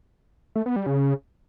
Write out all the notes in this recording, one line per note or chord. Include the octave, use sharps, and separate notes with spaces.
A3
B3
G3
C#3